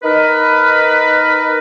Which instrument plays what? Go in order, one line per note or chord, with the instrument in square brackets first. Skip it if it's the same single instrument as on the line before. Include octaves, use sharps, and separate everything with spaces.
[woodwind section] D#4 A#4 B4